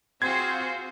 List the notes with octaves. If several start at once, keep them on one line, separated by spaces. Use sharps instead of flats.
C4 F4 F#4 G#4 C5 G#6